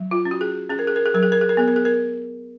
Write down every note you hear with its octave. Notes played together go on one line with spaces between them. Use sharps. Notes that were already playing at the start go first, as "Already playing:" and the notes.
Already playing: F#3
F4
C#4
F#4
G#4
C#4 G#4
A#4
G#4
A#4
G#4
F#3 A#4
G#4
A#4
G#4
A#4
B3 G#4
A#4
G#4
A#4